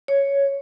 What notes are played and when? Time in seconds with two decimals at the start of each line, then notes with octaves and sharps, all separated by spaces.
0.08 C#5